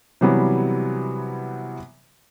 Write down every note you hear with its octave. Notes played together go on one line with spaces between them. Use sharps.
C3 E3 F#3 G3 B3